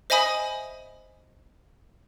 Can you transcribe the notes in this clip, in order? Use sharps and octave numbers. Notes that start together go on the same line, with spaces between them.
C5 D#5 E5 G#5 B5 D#6